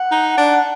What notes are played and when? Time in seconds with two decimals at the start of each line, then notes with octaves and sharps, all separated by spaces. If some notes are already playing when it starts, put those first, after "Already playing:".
Already playing: F#5
0.11 D#4
0.37 D4